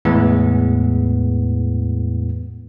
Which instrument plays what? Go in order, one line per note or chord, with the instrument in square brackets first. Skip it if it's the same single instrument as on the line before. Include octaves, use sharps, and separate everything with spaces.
[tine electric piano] E2 A2 E3 G#3 B3